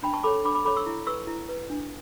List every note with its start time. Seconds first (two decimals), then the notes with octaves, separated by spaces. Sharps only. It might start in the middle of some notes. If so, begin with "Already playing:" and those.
0.03 D4 G5 B5
0.13 A5 C#6
0.23 A4 C#5 B5 D6
0.45 D4 B5 D6
0.55 B5 D6
0.65 A4 C#5 B5 D6
0.76 C#6 E6
0.86 E4
1.07 B4 C#6 E6
1.27 E4
1.49 B4
1.70 D4